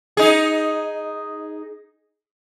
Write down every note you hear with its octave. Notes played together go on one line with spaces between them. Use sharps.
D#4 G#4